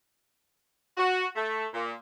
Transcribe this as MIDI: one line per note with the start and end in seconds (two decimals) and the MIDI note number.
0.98 1.25 66
1.35 1.65 57
1.74 1.92 46